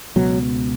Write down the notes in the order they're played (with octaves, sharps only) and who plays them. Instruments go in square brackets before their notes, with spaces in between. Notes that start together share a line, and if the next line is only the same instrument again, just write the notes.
[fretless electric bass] C#2 B2 F#3